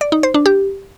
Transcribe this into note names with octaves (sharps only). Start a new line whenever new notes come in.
D5
D#4
C5
D4
G4